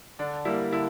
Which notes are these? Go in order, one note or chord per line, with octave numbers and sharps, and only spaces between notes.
D3 D4
G3 A#3 E4
D3 E4